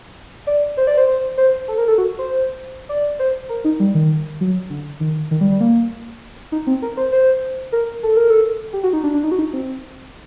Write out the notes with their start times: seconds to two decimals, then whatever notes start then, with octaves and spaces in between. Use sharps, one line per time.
0.47 D5
0.77 C5
0.87 D5
0.97 C5
1.08 C5
1.38 C5
1.68 A4
1.78 A#4
1.88 A4
1.98 F#4
2.19 C5
2.89 D5
3.19 C5
3.49 A#4
3.65 D#4
3.80 G3
3.95 D#3
4.41 F#3
4.70 D3
5.00 D#3
5.31 D#3
5.41 G3
5.51 G3
5.61 A#3
6.52 D#4
6.67 C4
6.82 A#4
6.97 C5
7.12 C5
7.72 A#4
8.03 A4
8.17 A#4
8.30 A4
8.73 G4
8.83 F#4
8.93 D#4
9.04 D4
9.14 D4
9.24 D#4
9.32 F#4
9.39 D#4
9.53 C4